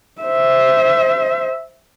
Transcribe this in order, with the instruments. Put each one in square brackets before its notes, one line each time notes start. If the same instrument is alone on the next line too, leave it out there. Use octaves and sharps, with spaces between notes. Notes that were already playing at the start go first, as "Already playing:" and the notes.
[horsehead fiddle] C5 E5